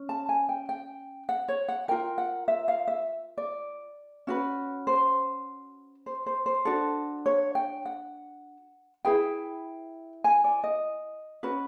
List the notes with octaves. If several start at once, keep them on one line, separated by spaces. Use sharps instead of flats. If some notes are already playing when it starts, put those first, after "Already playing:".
Already playing: C#4
A5
G#5
G5
G5
F#5
C#5
F#5
F4 A#4 G5
F#5
E5
F5
E5
D5
C#4 F#4 B4
C5
C5
C5
C5
D4 F#4 A4
C#5
G5
F#5
E4 G#4 B4 G5
G#5
D5
D#5
C#4 F#4 B4